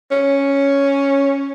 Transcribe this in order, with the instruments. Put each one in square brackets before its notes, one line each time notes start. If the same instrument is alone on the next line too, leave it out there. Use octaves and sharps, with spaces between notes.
[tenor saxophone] C#4